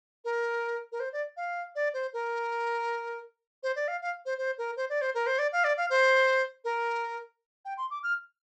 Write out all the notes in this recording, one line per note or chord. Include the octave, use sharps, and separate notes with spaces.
A#4
A#4
C5
D5
F5
D5
C5
A#4
C5
D5
F5
F5
C5
C5
A#4
C5
D5
C5
A#4
C5
D5
F5
D5
F5
C5
A#4
G5
C6
D6
F6